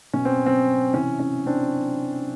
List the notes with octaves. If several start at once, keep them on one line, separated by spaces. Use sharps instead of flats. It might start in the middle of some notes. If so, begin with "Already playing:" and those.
B2 C#4
C4
C4
C3 E3 C#4
C#4
C4 D4